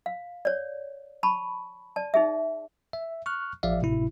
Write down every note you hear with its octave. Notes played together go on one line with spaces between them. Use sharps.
F5
C#5 D5
A5 B5 C#6
D5 A5
D#4 G#4 E5
E5
C#6 F6 F#6
A1 F3 D5 E5 F5
G#1 A2 C3 E4